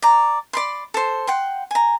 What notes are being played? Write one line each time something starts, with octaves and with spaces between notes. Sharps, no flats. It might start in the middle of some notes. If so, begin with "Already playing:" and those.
D5 A#5
D5 B5 C6
A4 C5
F#5 G5 C6
G#5 A#5